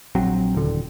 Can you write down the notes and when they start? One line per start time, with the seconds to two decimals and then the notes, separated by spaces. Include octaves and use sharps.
0.15 A#1 F#3 C4
0.55 D#1 D3